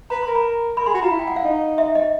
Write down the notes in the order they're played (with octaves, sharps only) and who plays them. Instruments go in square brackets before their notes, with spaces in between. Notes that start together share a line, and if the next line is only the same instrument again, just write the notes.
[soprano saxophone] B4 [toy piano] A#5
[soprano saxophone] A#4 [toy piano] B5
[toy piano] A#5
[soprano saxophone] A#4 [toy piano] B5
[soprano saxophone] G#4 [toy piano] C6
[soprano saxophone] F#4 [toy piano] B5
[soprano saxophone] F4 [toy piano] A#5
[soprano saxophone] E4
[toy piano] G5
F#5
F5
[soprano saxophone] D#4
[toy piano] E5
D#5